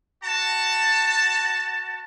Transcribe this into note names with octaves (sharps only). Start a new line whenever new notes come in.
F#4 A5